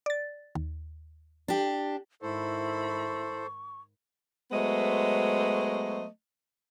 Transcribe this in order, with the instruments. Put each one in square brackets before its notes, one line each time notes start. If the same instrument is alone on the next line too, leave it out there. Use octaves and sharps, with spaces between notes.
[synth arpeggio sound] D5 A6
D#2
[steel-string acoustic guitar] D4 G4
[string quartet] G#2 D#3 B5 [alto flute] E4 [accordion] A4 C5 [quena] C#6
[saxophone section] F#3 G#3 A3 B3 C5 D#5